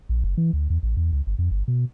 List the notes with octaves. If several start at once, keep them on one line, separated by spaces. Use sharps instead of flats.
A#1
F#1
E3
D2
E2
A1
E2
C#2
G1
F2
G1
B2